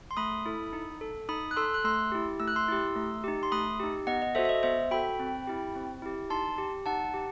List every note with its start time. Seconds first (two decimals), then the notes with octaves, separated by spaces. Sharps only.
0.11 C6
0.17 A3 B5 D#6
0.46 E4 A4
0.73 D#4
1.01 A4
1.29 D#4 B5 D#6
1.51 F#6
1.56 A4 C6 E6
1.74 F#6
1.84 A3 C6 E6
2.12 E4 G4
2.40 A3 E6
2.48 F#6
2.56 C6 E6
2.68 E4 G4
2.96 A3
3.24 D#4 G4
3.43 C6
3.52 A3 B5 D#6
3.80 D#4 G4
4.07 B3 D#5 F#5
4.22 D#5
4.35 F#4 A4 C5 E5
4.45 E5
4.49 D#5
4.63 B3 C5 E5
4.91 F#4 A4 G5 B5
5.20 C4
5.47 E4 G4
5.75 C4
6.02 E4 G4
6.30 D#4 A5 C6
6.58 G4
6.86 D#4 F#5 A5
7.14 G4